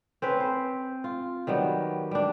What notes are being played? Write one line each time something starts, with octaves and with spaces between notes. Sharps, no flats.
C4 C#4 B4
C5
F4
D#3 F#3 G3 B3
G3 D4